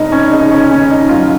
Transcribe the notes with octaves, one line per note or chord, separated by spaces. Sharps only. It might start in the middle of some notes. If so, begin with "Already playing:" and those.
Already playing: F1 D#4
C#4
C#3 D#4
C#4
D#2 C#4
D#4
F#3 F4